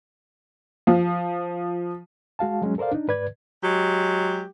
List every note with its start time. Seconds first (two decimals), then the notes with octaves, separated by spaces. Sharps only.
0.87 F3
2.39 G#3 F#4 F5 A5
2.62 F#3 G#3 C#4
2.78 A4 A#4 C5 D5 F5
2.92 D4 D#4
3.08 G#2 B4 D5 G#6
3.62 F#3 G#3 G4